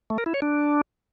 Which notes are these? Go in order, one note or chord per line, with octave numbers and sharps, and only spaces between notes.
A3
A#4
E4
C#5
D4